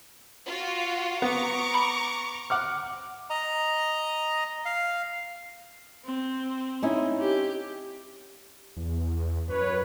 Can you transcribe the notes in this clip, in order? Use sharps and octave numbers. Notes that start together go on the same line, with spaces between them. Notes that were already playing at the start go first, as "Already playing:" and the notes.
F4 F#4
B3 A#5 C#6 D6
B5
F#5 D6 F6
D#5 A#5
F5
C4
C#4 D#4 E4
G4
E2
F#2 B4 C#5